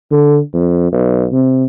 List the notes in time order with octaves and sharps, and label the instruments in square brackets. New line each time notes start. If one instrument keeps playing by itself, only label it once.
[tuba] D3
F2
B1
C3